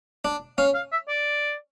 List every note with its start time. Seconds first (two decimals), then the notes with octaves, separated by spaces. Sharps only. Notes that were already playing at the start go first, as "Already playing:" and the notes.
0.25 D4
0.58 C#4 F5
0.74 F5
0.92 E5
1.08 D5